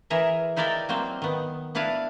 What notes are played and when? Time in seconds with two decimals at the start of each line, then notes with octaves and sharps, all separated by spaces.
0.10 E3 G#4 A#4 E5
0.56 D#4 E4 A#4 D5 F5 G5
0.89 F#3 A#3 C4 C5
1.22 D#3 B3
1.75 B3 D4 E4 B4 F5